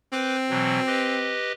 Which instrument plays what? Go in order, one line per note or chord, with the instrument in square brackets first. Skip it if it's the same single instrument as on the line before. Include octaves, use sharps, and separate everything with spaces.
[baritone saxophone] C4 [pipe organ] B4 D6 G6
[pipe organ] B2 E3 F#3
G4 B4 D#5